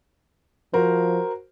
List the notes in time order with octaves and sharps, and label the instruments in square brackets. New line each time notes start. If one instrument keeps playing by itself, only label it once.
[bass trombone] F3 [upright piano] F#4 A#4 C5